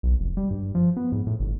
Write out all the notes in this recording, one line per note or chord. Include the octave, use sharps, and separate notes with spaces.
B1
F1
G3
G2
F3
B3
G#2
A2
G1